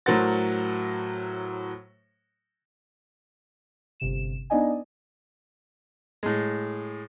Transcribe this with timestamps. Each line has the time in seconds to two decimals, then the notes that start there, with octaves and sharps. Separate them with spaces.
0.06 A2 F#3 A#4 C5 F#5 A6
4.00 G1 C3 E7
4.50 B3 D4 D#4 D5 D#5 G#5
6.23 A2 G#3